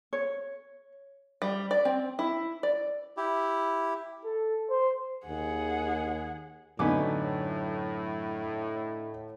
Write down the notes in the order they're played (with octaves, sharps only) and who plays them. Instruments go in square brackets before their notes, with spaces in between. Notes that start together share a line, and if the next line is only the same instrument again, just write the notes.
[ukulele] C#5
[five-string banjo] G3
D5
C4
E4
D5
[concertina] E4 G4
[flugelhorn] A4
C5
[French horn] D#2 [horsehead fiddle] G#4 F#5
[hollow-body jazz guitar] F#2 [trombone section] A2 [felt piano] D3 D#4 [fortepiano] B3 C#4 D6